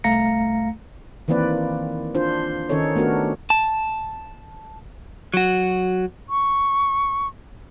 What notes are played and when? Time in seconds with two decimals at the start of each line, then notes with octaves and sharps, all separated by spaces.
0.04 C2 A3 F5 A#5 A#6 C#7
1.28 D#3 E3 A#3 C4 B4 D5
2.15 D4 F4 C5
2.69 D#3 C#4 D#4 A4 C#5
2.96 A3 B3 D4 F#4 A#4
3.50 A5
5.34 F#3 F#4
6.29 C#6